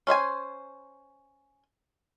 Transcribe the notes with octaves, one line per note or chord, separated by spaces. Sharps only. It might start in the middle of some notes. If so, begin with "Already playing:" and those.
C#4 C5 E5 G#5